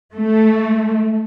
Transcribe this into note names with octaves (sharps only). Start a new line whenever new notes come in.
A3